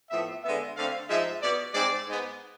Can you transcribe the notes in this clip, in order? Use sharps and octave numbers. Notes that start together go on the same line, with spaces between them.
A2 F3 B3 E5
D3 G#3 B3 E5
D3 A3 C4 F5
G#2 F3 G#3 E5
B2 B3 D5
G#2 G#3 C4 D5
G#2 G#3 B3